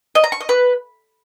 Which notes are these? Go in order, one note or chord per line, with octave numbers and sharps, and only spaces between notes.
D#5
A#5
C#6
D#5
B4